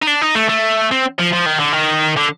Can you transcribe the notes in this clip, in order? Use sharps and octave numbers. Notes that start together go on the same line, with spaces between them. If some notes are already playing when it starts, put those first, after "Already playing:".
D#4
D4
D#4
A3
A3
C4
F3
F3
D#3
D3
D#3
D3